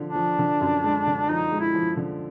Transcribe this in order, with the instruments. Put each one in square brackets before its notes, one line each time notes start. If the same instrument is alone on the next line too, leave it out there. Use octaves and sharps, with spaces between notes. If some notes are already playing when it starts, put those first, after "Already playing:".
Already playing: [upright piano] D3 F3
[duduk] D4
[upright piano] F3
D3
F#2
G#3
D3
[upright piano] F3 [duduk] D#4
[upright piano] G#3
[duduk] E4
[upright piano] F3
D3